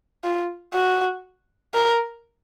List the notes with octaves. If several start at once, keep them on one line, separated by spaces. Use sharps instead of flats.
F4
F#4
A#4